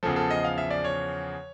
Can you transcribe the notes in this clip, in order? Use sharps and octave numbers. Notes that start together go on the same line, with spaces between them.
E2 C#3 F3 A4
A4
D#5
F5
E5
D5
C#5